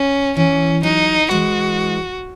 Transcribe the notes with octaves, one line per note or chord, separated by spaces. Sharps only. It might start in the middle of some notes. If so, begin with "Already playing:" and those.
Already playing: C#4
E3 C#4
F#3 D#4
E3 G#3 F#4